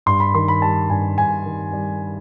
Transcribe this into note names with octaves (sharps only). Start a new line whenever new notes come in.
G2 C6
B5
D#3 C6
B5
G3 A5
G2 G#5
G2 G#5
D#3
G3